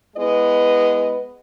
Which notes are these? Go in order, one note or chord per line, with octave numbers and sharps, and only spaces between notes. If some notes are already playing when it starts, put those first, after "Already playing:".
G#3 B3 E4 B4 D#5